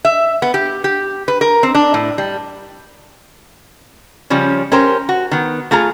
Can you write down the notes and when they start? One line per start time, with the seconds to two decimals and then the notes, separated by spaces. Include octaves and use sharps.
0.05 E5
0.42 B3
0.54 G4
0.84 G4
1.28 B4
1.41 A#4
1.63 C4
1.75 D4
1.94 A2
2.18 G3
4.30 C#3 F3 G3 C#4
4.72 C#4 G4 A#4 C5
5.09 F#4
5.31 D#3 B3
5.71 A3 F4 G#4 A#5